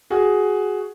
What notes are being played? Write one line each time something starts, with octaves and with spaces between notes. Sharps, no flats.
F#4 G#4